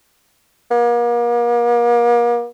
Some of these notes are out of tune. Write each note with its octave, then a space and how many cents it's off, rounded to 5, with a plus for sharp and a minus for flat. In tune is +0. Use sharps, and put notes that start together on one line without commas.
A#3 +40